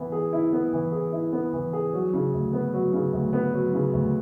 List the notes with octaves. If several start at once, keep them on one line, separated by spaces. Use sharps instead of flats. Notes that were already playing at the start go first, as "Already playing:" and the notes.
Already playing: E3 B3 E4
G#4
E4
B3
E3
G#4
E4
B3
E3
G#4
F#3
C#3
D2
B3
F#3
C#3
D2
B3
F#3
C#3
D2